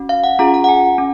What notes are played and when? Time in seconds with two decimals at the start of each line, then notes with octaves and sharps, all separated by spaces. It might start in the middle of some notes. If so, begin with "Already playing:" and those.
Already playing: C#4 F#4
0.09 F5
0.24 F#5
0.39 C#4 F4 G#4 A#5
0.54 A#5
0.64 F#5
0.69 G#5
0.98 C#4